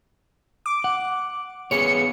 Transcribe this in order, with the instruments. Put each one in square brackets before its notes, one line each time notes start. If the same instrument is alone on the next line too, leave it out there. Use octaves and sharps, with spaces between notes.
[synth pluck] D6
[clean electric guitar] F#5
[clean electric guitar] B3 G#4 C#5 [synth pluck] C#7